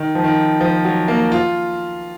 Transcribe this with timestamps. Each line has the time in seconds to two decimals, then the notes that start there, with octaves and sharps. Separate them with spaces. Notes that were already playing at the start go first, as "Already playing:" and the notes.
Already playing: D#3
0.15 F3
0.24 D#3
0.61 F3
0.85 F#3
1.08 A#3
1.32 F4